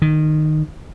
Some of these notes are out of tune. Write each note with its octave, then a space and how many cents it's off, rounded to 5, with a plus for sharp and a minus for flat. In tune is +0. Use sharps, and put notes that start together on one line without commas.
D#3 -15